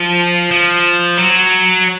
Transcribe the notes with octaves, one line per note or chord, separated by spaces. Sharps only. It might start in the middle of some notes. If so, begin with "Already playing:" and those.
Already playing: F3
F3
F#3